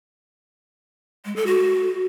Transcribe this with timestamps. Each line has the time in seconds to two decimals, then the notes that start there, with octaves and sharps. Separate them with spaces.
1.25 G#3
1.36 A4
1.47 F#4